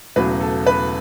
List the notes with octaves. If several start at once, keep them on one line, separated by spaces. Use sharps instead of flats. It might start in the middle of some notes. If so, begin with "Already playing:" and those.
E1 E2 C#3 F#3 A3 B4
A4
B4